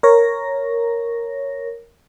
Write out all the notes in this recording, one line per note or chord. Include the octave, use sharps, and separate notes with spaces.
A#4 C#5 A#6